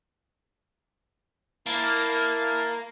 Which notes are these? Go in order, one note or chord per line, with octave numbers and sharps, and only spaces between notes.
A#3 E4 F5 A5